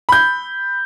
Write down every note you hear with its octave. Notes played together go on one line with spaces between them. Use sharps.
B5 G6